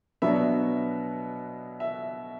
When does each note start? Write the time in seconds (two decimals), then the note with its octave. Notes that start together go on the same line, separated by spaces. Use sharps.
0.22 B2 F#3 B3 D4 E5
1.80 E5